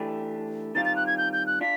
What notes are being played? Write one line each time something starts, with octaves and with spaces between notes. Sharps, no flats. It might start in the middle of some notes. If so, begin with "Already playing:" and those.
Already playing: E3 A3 D4 G4
D#3 G3 C4 F4 A6
A6
F#6
G#6
G6
G6
F#6
D4 F4 B6